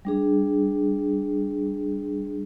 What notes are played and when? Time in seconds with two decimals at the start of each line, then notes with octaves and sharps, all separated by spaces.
0.05 G3 D4 G#4